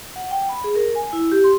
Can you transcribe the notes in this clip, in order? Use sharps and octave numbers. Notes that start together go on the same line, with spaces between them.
F#5
G5
B5
G#4
A#4
G#5
E4
G4
C6